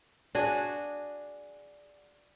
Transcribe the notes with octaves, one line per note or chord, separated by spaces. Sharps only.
D4 F#4 G#4